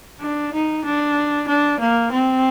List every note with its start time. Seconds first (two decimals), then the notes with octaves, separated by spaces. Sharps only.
0.22 D4
0.54 D#4
0.85 D4
1.48 D4
1.80 A#3
2.12 C4